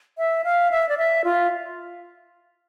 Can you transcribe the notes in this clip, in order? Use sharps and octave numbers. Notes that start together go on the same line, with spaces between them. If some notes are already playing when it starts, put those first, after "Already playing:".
E5
F5
E5
D5
E5
F4